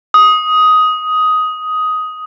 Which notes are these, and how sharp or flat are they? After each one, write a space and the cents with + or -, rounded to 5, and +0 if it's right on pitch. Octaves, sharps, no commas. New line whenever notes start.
D#6 +10